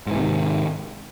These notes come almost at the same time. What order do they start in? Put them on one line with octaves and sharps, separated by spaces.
G#2 E3 C3 D#3